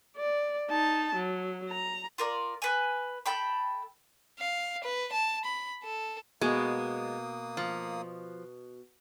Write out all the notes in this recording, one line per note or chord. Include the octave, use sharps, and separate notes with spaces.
D5
D#4 A5
F#3
A#5
F4 A#4 D5
B4 G#5
A4 G5 B5
F5
B4
A5
B5
A4
B2 G#3 A#3 B3 D#6
F3